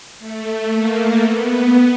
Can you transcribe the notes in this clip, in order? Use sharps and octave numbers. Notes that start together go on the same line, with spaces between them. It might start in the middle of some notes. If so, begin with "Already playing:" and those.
A3
A#3
B3